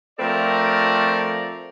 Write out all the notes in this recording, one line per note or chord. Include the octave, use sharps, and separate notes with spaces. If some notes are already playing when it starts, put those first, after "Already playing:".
F3 A3 C4 A4 A#4 D5